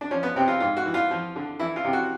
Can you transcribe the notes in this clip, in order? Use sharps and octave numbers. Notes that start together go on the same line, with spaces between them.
D4
F3 C#4
B3
C3 C4
F4
G#2 F4
F#4
E3
F4
F3
D3
E3 E4
F4
C3
F#4